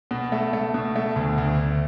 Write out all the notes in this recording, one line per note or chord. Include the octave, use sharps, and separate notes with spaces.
B2
A3
A3
B2
A3
D2
D2
D2